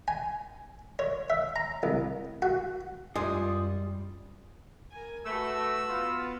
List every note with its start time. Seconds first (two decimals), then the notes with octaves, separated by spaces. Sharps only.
0.08 G#5
0.99 C#5
1.30 E5
1.56 A#5
1.83 C2
2.42 F#4
3.15 F#2 G3 G#3 F4 D#6
4.91 A#4 G#5
5.25 A3 F#4 B4 E6
5.88 B3 F4